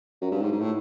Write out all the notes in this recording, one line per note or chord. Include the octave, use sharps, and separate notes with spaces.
F#2
G2
G#2
G#2
A2